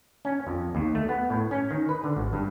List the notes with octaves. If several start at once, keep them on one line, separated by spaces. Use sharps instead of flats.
C#4
F2
D#2
A3
B3
A2
C#4
D#3
B4
D3
G#1
G2